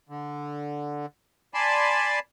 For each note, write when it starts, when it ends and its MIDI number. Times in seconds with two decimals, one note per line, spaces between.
0.09 1.06 50
1.54 2.19 74
1.54 2.19 80
1.54 2.19 81
1.54 2.19 83
1.54 2.19 84